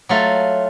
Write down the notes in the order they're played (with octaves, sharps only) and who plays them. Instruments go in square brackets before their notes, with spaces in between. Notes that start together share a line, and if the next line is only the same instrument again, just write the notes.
[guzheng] F#3 A3 F4 A4